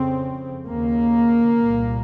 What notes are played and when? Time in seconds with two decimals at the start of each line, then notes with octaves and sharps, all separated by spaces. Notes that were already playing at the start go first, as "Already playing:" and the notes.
Already playing: F2 C#3 C4
0.67 D#2 C#3 A#3
1.61 C2 A#2